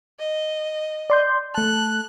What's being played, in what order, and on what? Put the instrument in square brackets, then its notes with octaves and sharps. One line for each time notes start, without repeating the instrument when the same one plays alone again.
[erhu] D#5
[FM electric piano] D5 C6 G6
[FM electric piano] A3 A5 [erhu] F#6